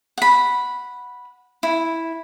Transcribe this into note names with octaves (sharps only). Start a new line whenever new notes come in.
F#5 B5
E4